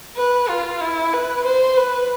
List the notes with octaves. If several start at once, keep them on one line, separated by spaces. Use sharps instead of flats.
B4
F4
E4
B4
C5
B4